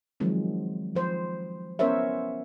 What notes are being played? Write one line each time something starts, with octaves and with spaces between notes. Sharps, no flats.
D#3 F3 F#3 G#3 C4
F3 C5
B3 C#4 A#4 C5 C#5 E5